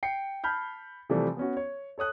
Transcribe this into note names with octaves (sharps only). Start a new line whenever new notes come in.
G5 C7 C#7
A5 B5 F6 G6
C3 E3 F3 G3 A3
B3 C#4 F#4
C#5
A4 C#5 D#6 F#6